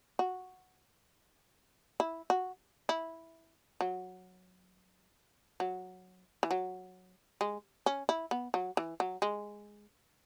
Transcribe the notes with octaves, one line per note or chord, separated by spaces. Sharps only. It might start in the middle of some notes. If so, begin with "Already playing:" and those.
F#4
E4
F#4
E4
F#3
F#3
E3
F#3
G#3
C#4
E4
B3
F#3
E3
F#3
G#3